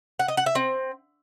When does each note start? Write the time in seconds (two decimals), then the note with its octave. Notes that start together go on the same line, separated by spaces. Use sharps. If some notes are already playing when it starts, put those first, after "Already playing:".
0.19 F#5
0.28 D#5
0.37 F#5
0.46 E5
0.55 C4